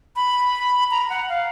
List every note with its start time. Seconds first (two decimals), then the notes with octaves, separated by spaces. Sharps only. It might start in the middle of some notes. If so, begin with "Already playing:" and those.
0.16 B5
0.91 A#5
1.10 F#5
1.29 F5